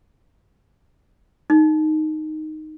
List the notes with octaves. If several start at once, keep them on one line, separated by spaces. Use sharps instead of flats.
D#4